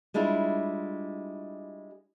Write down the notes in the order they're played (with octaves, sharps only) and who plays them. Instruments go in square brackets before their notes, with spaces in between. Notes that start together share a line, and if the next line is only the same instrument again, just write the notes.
[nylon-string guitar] G3 G#3 D4 E4 F4